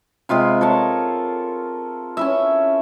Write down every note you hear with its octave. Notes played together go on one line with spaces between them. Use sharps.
C3 G#3 F4 B5
A4 A#4 C#5 A5
C#4 E4 E5